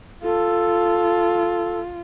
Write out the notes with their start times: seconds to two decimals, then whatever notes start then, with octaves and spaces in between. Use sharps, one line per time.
0.23 F4 A4